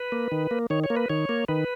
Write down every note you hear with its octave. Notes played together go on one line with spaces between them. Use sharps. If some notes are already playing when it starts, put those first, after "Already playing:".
Already playing: B4
A#3
D#3
A#3
D#3 C#5
C#5
A#3
B4
D#3 C#5
A#3
D#3 B4